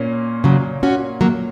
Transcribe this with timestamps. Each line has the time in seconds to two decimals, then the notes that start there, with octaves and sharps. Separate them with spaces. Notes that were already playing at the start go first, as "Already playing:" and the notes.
Already playing: A#2 A#3 C#4
0.44 C#3 F#3
0.83 C#4 F#4
1.21 F#3 A#3